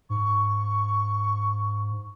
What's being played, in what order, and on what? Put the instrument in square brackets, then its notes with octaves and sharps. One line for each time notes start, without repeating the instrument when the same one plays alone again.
[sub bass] G#2 [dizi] C#6